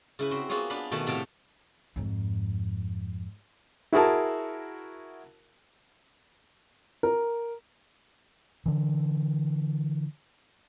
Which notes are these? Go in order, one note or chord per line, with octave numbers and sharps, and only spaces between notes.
C#3 E4 B4
C4 F#4
A#3 B3 F4 F#4 G#4 C#5
B3 D4 B4 F5 B5
B2 D#3 A3 F#4 B4 A5
A2 C3 A4 F5 G5 A5
F2 G#2
E4 F#4 G#4 A#4 A5
A#4
D3 E3